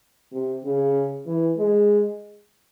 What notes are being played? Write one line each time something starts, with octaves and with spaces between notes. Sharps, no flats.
C3
C#3
E3
G#3